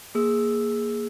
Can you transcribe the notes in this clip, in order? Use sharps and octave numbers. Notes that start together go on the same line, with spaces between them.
A#3 G#4 E6